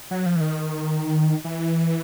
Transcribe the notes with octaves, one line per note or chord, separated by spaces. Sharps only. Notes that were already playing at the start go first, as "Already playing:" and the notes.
F#3
F3
E3
D#3
E3